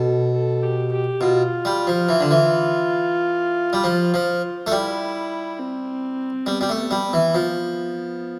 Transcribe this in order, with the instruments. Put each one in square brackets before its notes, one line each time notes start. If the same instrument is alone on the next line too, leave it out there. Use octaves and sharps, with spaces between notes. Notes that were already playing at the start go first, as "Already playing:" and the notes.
Already playing: [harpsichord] B2 [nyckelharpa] A4
[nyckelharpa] A4
G4
G4
[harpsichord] B2 [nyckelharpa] F4
[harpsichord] G3
F3
E3
D3
E3
G3
F3
F3
A3
[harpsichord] G3 [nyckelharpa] E4
[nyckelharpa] C4
[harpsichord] G3 [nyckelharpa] B3
[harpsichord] G3
A3
[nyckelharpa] B3
[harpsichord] G3
[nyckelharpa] B3
[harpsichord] E3
[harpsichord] F3 [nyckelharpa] B3